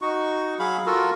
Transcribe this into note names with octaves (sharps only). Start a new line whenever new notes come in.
D#4 F#4 C#6
F#3 G#4 F5 B5
F4 F#4 A4 A#4